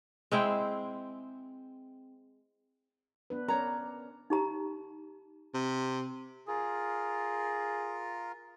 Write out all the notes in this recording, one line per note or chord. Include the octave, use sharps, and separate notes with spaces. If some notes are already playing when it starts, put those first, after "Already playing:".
G#3 C4 E4 G5
B3 D4 B4
C#4 A#4 C#5 D5 A#5
D#4 G4 A#5
C3
F4 G#4 A#4